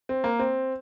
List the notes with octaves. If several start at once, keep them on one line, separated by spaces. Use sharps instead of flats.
C4
A#3
C4